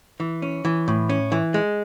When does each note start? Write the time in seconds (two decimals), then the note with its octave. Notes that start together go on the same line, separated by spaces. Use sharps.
0.20 E3
0.42 C#4
0.65 E3
0.88 A2
1.09 C#4
1.32 E3
1.54 G#3